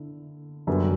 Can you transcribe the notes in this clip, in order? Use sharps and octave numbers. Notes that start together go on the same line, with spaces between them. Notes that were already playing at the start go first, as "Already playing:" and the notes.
Already playing: D3 E4
F#2 D3 G3 B3